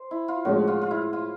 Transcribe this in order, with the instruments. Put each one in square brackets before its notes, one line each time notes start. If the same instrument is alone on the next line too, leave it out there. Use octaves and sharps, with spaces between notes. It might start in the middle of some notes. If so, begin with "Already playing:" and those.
Already playing: [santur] C5
E4
F4
[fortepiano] A2 F3 G#3 C#4 [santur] F#4
[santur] F4
F4
E4
F4